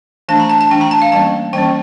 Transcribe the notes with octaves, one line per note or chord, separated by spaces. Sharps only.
E3 A3 D4 A5
A#5
A5
A5
E3 A3 D4 G5
A#5
A5
F5
E3 G3 A#3 C#4 A5
E3 G3 A#3 C#4 G5